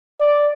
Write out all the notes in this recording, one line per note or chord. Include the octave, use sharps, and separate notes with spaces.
D5